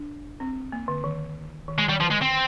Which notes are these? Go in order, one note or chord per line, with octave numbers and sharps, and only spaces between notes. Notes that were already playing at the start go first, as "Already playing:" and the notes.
Already playing: D4
C4
A#3
D3
D#3
D#3
D#3 G#3
D#3 G3
D3 F3
G#3
C4